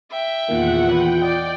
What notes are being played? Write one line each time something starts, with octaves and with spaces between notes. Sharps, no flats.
E5 G5
E2 A#2 D#3 A#3 F4 F#5
B4 G5
D5 D#5